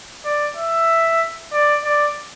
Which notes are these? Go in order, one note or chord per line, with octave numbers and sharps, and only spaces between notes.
D5
E5
D5
D5